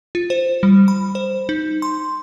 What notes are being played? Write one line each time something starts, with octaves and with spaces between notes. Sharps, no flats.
F4
C5
G3
B5
C5
D#4
C6